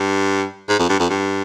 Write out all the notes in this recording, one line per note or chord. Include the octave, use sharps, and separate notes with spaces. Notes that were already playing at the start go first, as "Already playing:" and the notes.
Already playing: G2
G#2
F2
G2
F2
G2